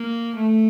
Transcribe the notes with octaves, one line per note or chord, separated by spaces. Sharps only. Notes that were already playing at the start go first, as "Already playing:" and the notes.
Already playing: A#3
A3